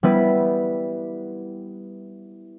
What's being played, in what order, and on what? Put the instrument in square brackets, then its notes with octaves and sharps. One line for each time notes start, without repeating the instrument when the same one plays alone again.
[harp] G3 B3 E4 B4